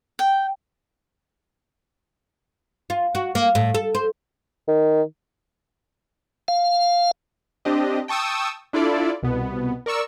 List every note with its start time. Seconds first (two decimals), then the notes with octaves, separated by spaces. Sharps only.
0.19 G5
2.90 F4
3.15 F#4
3.35 A#3
3.55 A2
3.74 A4
3.95 C5
4.68 D#3
6.48 F5
7.65 C4 D4 G4 D#5
8.08 G5 A5 C#6 D#6 E6
8.73 D4 E4 F4 A4 D5
9.23 C2 B2 B3
9.86 A#4 D5 C#6 E6